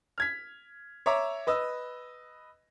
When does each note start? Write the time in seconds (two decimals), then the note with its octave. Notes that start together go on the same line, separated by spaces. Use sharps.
0.18 F6 G#6 B6
1.06 C#5 E5 A#5 D6
1.47 B4 D#5 E6